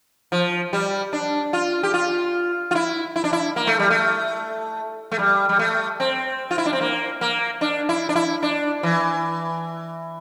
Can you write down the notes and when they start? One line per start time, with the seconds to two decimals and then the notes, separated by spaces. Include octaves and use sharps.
0.32 F3
0.73 G3
1.13 D4
1.53 F4
1.83 G4
1.94 F4
2.71 F4
2.75 E4
3.16 E4
3.24 D4
3.33 E4
3.56 A#3
3.67 A3
3.79 G3
3.90 A3
5.11 A3
5.19 G3
5.49 G3
5.59 A3
6.00 C4
6.51 F4
6.58 E4
6.66 D4
6.73 C4
6.81 A#3
7.21 A#3
7.61 D4
7.89 E4
8.09 D4
8.15 E4
8.43 D4
8.83 E3